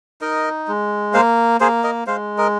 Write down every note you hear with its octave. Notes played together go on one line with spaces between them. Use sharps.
D#4 A#4 D#5
G#3
A#3 C5 F5
A#3 G#4 C5
A#4 D#5
G#3 C5 F5
A#4 D#5